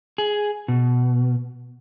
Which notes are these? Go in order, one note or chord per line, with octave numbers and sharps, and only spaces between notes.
G#4
B2